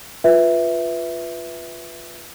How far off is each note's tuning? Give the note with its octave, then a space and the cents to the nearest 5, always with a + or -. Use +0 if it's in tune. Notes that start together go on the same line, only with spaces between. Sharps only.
F4 +0 B4 +0 E5 +0